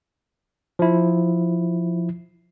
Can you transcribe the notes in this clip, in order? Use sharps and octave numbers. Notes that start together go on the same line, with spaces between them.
F3 E4